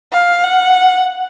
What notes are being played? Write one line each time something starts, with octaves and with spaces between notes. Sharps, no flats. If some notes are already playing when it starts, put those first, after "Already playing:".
F5
F#5